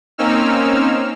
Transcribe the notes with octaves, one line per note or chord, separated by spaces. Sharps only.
A#3 C4 C#4 D#4 E6 F6